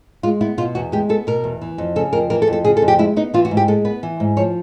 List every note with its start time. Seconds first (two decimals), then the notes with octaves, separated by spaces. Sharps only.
0.23 G#3 F4
0.41 B3 E4
0.58 B2 F4
0.75 E2 F#4
0.92 G#3 G4
1.09 B3 A4
1.27 B2 A#4
1.44 E2
1.62 E3
1.78 F2
1.96 C#3 A4
2.13 F2 A#4
2.30 E3 A#4
2.42 A4
2.48 F2
2.53 A4
2.65 C#3 G#4
2.77 A4
2.82 F2
2.88 G4
2.99 G#3 E4
3.16 B3 D#4
3.34 E3 F4
3.45 F#4
3.51 G#2
3.57 G4
3.68 G#3 A4
3.85 B3 B4
4.03 E3
4.20 G#2
4.37 F3 C#5